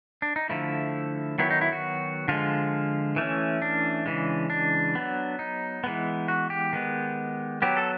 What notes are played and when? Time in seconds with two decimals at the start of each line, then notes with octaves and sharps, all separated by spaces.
0.22 D4
0.36 D#4
0.49 D3 F3 A3 E4
1.38 D#3 F#3 B3 E4
1.51 D#4
1.61 E4
1.72 F#4
2.28 D3 F3 G#3 F4
3.16 E3 A3 C#4
3.62 D4
4.06 C#3 E3 G#3
4.50 D4
4.95 F#3 B3
5.39 D#4
5.84 E3 G#3 B3
6.28 F#4
6.50 G4
6.73 D#3 G#3 B3
7.62 F#3 B3 G4
7.77 A4